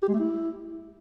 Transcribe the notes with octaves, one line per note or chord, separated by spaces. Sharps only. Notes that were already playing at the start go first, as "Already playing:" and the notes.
G4
G#3
A3
E4